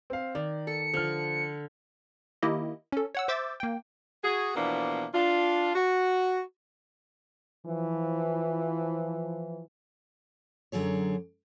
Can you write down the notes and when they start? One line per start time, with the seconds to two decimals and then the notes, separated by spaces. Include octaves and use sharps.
0.10 C4 F5
0.35 D#3 D5
0.67 A4 C#7
0.94 D3 F3 F6
2.42 D#3 A#3 E4 G4 D#5
2.92 C#4 A4
3.15 C#5 F#5 E6
3.28 C5 E5 D6 E6 G6 A6
3.60 A#3 G5
4.24 F#4 G#4
4.55 B2 E3 F3 A#3 B3 D4
5.14 D4 F4
5.75 F#4
7.66 E3 F3
10.72 F#2 D3 F#3 G#4 C#5